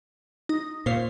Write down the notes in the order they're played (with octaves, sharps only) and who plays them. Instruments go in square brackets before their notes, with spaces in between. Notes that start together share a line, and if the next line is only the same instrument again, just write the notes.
[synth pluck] D#4
[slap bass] A#2 [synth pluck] C5 C#5 F5